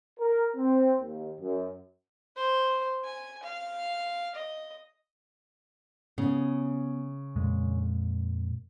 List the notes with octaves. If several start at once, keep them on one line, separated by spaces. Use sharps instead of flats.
A#4
C4
D#2
F#2
C5
G#5
F5
D#5
C#3 B3
F2 A#2 G#3